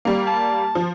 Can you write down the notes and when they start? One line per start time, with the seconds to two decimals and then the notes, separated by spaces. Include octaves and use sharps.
0.05 G3 A#3
0.27 A5
0.75 F3